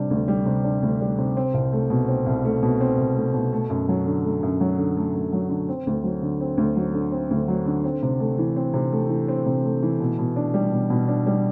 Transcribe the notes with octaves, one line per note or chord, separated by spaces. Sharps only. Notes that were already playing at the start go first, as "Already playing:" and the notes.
Already playing: C3 G3 D4
D2
G3
C3
D4
D2
G3
C3
C4
C2
A3
B2
C4
C2
A3
B2
C4
C2
A3
B2
A3
F#2
F#3
D3
A3
F#2
F#3
D3
A3
F#2
F#3
D3
C4
D2
F#3
D3
C4
D2
F#3
D3
C4
D2
F#3
D3
C4
C3
A3
E3
C4
C3
A3
E3
C4
C3
A3
E3
B2
B2
D4
G3
B2
B2
D4
G3